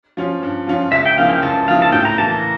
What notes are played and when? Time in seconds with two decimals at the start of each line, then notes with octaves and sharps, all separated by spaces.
0.17 F3 C#4 F4
0.43 G2
0.67 F3 C#4 F4
0.92 C#2 E5
1.05 G5
1.18 C#3 F3 A#3 E4 F5
1.29 G5
1.43 C#2 A5
1.68 C#3 F3 A#3 E4 F5
1.82 A5
1.92 A2 G5
2.05 A#5
2.17 E3 A#3 A5
2.30 A#5